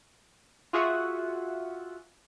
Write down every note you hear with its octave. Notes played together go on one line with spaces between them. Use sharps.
F4 F#4 G#4 E5 F#5